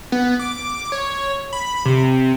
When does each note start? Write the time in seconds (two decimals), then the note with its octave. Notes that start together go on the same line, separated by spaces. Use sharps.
0.12 B3
0.39 D6
0.92 C#5
1.53 B5
1.86 C3